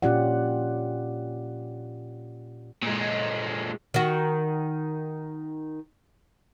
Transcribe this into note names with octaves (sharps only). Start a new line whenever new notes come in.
A#2 C#4 F4 G4 D5 F#5
A#2 G#3
D#3 F#4